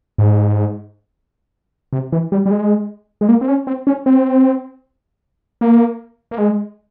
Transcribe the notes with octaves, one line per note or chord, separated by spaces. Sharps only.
G#2
C3
E3
G3
G3
G#3
G#3
A#3
C4
C#4
C4
C#4
C4
A#3
A#3
G#3